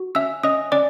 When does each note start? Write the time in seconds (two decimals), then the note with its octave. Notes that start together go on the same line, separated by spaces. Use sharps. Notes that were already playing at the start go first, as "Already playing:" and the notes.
Already playing: F#4
0.15 C#4 E5 E6
0.43 C#4 D#5 D#6
0.72 C#4 D5 D6